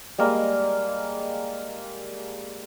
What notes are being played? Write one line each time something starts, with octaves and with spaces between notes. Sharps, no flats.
G3 G#3 A#3 D#5